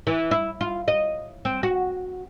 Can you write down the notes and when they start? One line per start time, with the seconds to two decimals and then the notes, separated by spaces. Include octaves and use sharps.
0.07 E3
0.31 E4
0.61 F4
0.88 D#5
1.45 C4
1.63 F#4